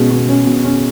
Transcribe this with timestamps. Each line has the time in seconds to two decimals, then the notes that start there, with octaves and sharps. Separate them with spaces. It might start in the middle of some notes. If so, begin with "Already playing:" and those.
Already playing: B2 G#3 C#4
0.11 B2
0.29 C#4
0.46 B2
0.64 C#4